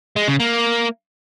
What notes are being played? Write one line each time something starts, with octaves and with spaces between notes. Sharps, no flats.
G#3
C#3
A#3